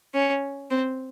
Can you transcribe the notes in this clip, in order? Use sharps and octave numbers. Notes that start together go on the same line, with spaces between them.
C#4
C4